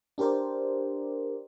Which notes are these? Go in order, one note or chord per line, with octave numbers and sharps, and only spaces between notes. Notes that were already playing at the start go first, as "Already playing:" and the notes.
D4 G4 A#4 C5 D5